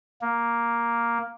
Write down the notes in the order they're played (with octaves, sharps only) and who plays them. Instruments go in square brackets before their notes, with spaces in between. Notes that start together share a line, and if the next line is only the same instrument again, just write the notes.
[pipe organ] A#3